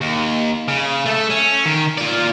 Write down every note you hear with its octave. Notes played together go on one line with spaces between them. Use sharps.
D#2
C#3
A3 A4
C#4
D#3
F4 D5